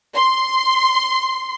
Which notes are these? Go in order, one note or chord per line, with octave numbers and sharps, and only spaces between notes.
C6